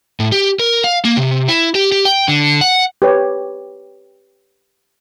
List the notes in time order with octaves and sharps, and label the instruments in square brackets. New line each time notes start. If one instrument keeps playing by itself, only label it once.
[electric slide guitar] A2
G4
A#4
F5
A#3
C3
E4
G4
G4
G5
D3
F#5
[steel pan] G4 B4 C#5